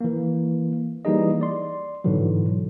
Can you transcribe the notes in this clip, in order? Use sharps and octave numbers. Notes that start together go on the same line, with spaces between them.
E3 A#3
E3 G3 A#3 D#4 G#4 D#5
D5 C6
G#2 B2 D3 E3 F#3